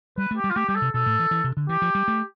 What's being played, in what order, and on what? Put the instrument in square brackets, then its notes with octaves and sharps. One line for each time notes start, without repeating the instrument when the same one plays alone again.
[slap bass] G3 [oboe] B4
[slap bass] A3
[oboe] G4
[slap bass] G3
[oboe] F4
[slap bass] A3 [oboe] G4
[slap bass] G3 [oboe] G4
[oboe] A4
[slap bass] C3
[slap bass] B2 [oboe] A4
[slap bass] A2
E3
E3
C3
D3
[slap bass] E3 [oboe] G4
[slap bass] F3
G3
A3